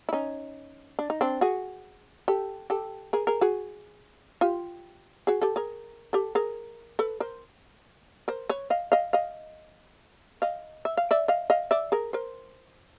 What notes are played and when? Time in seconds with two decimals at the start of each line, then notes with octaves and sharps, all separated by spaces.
0.09 E4
0.13 C#4 D#4
0.99 D4
1.10 D#4
1.21 C4 D4
1.41 F#4 G#4
2.28 G4 A4
2.70 G4 A4
3.13 G#4 A#4
3.27 G#4 A#4
3.41 F#4 G#4
4.41 F4 G4
5.27 F#4 G#4
5.42 G4 A4
5.56 G#4 A#4
6.13 G4 A4
6.35 G#4 A#4
6.99 A4 B4
7.20 A#4 C5
8.28 A#4 C5
8.49 B4 C#5
8.70 D#5 F5
8.92 D#5 F5
9.13 D#5 F5
10.42 D#5 F5
10.85 E5
10.97 F5
11.11 D5 E5
11.28 D#5 F5
11.50 D#5 F5
11.71 D5 E5
11.92 G#4 A#4
12.13 A#4 C5